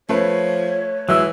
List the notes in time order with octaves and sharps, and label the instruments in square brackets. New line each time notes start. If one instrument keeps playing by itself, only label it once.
[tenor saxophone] F3 [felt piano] A3 B4 [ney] C#5
[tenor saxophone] E3 [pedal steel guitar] F#3 G#3 E6